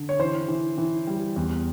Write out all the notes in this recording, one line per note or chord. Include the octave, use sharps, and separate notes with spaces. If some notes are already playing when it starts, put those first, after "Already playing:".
Already playing: D3
C#5
E3 C5
E3
E3
G3
E2